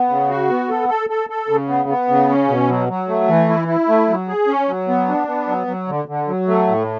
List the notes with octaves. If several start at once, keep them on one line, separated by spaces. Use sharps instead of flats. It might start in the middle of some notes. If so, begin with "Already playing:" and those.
Already playing: B3
C#3
F#4
B3
A4
A4
A4
A4
C#3
B3
B3
C#3
C#4
B2
F#3
F#3
A3
E3
E4
E4
A3
F#3
G#4
C#4
F#3
B3
D4
B3
F#3
F#3
D3
D3
F#3
A3
A2